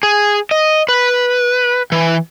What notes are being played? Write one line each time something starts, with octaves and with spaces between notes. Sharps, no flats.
G#4
D#5
B4
E3